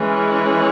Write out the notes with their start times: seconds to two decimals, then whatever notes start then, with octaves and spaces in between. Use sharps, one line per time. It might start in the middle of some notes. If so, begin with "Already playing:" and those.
Already playing: E3 G#3 C#4